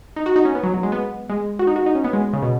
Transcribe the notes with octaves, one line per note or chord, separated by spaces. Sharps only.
D#4
F#4
D#4
C#4
B3
F#3
F#3
G#3
B3
G#3
F#4
D#4
F#4
D#4
C#4
B3
G#3
C#3
B2